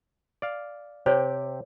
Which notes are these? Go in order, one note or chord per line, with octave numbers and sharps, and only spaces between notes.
D5 F5
C3 G4 C5 C#5 G5